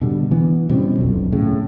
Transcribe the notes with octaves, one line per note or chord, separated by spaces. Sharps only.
B2 D3 G3
E3 B3
B2 G3 C4 C#4
D#1 B1 F2
A2 C#3